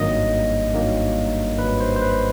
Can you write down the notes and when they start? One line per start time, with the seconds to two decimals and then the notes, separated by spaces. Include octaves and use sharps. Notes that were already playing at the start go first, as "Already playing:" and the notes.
Already playing: G#1 G2 D#3 F#3 A#3 D#5
0.72 G#1 G2 D#3 F#3 A#3
1.58 G#1 G2 D#3 F#3 A#3 B4
1.80 C5
1.96 C5
2.02 B4